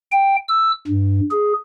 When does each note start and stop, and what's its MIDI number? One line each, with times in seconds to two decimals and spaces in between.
0.12 0.36 79
0.49 0.72 88
0.87 1.20 43
1.31 1.53 68